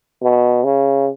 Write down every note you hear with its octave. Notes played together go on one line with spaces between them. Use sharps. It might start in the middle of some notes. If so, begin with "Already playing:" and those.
B2
C#3